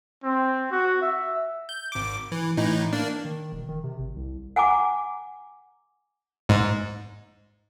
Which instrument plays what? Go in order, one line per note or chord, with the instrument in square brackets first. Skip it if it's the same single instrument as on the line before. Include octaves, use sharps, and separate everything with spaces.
[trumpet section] C4
F#4
E5
[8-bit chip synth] G6
G#1 D6
E3
A2 E3 D#4
A#3 D4
[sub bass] D#3
E1
D#3
C3
G#1
C2
[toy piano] F#5 G#5 A#5 D6
[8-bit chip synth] G#2